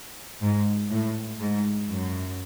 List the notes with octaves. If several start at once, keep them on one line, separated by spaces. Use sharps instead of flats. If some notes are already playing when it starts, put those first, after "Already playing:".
G#2
A2
G#2
F#2